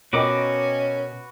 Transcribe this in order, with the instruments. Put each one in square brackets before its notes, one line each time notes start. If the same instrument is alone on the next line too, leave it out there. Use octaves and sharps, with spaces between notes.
[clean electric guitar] B2 [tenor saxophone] C#4 [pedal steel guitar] F#4 B4 D6 [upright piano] A#4 D#5 G5